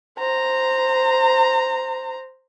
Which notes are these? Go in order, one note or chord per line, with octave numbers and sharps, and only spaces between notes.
C5 A#5